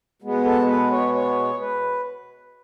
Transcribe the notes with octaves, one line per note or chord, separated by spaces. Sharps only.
B2 G#3 B3
A4
B4
C#5
C#5
B4